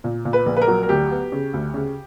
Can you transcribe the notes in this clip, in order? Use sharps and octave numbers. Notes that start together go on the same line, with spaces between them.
A#2
A#2
B4
A#1
B4
A#4
F#3
A#4
D2 G4
B3
C#3
D2
C#3